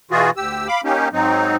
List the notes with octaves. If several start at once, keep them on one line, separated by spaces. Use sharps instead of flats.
B2 E3 F4 F#4 G#4
D2 G4 E6
F5 B5 D6
A#3 C#4 D#4 G4
G#2 F#3 C4 D#4